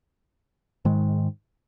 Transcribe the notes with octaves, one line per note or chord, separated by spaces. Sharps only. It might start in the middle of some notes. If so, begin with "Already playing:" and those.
G#2 D#3 G#3